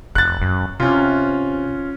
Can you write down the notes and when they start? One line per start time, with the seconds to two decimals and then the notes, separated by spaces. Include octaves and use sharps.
0.15 F1 F#6 A6
0.42 F#2
0.80 C3 C#4 F4